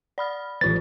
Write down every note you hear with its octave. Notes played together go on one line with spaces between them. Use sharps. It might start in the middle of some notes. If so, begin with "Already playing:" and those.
D5 B5 F6
A1 D#3 F3 F4 A6